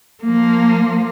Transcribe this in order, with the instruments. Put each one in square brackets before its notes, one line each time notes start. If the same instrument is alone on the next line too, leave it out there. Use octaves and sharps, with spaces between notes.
[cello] F3 A#3